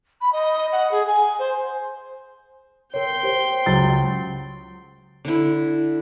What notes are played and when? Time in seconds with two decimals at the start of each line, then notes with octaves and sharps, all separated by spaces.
0.21 B5
0.33 D#5
0.72 F#5
0.91 G#4
1.07 G#5
1.39 C5
2.94 A#4 C#5 G5 C6
3.23 G4 C5
3.66 C#2 F#3 A6
5.25 D3 E4